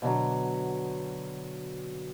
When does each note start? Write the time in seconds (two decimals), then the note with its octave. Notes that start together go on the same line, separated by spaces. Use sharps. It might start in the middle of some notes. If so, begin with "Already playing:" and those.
0.02 B2 D3 F3 F#3